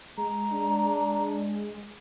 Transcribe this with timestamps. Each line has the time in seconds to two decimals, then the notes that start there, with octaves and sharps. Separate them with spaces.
0.18 G#3 A#5
0.52 D4